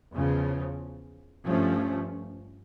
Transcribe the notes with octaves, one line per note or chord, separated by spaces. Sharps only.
E2 C#3 F3
G2 F3 A3 C#4